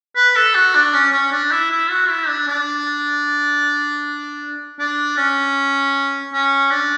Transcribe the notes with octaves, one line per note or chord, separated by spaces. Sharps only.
B4
A4
F#4
D4
C#4
C#4
D4
E4
E4
F#4
E4
D4
D4
D4
C#4
C#4
D4